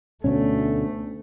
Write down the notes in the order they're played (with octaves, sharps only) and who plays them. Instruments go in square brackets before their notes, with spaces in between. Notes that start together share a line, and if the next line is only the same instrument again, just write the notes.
[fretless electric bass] D2 B2 C#4 [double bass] A3